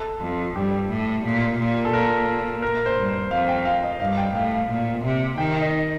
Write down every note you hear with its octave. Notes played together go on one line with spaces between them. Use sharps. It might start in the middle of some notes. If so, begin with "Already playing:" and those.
Already playing: A4
F2
G2 G4
A2
A#2
A#2
A4
A#2 A#4
A#4
C5
G2
C5
F2 F5
G5
F5
D#5
G2 F5
G5
A2 F5
F5
A#2
C3
D#3 G5
D#5